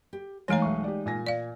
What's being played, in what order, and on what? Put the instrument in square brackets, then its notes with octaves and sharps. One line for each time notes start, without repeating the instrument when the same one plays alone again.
[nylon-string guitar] G4
[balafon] E3 A3 C#5 [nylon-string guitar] G#3 D#4 F5 [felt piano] G#5 A#5
[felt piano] B1 E5 C#6
G4 D5
A#2 G#5 A#6
[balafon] D5 F5